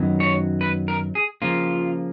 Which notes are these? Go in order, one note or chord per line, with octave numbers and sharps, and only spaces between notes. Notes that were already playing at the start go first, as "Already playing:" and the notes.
Already playing: F#2 D#3 F#3 B3
C#5
B4
A#4
G#4
C#3 F3 A#3 F4